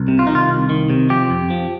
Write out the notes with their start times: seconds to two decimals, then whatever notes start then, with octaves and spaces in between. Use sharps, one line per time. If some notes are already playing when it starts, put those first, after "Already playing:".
Already playing: C2
0.08 C3
0.19 F4
0.27 D#3 D#4
0.35 F4
0.49 C2
0.69 D#3
0.90 C3
1.10 F3 G4
1.30 F2
1.50 F3